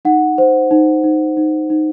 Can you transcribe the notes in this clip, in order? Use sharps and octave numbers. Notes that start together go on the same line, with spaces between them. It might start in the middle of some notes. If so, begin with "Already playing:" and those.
D#4 F#5
C5
D#4
D#4
D#4
D#4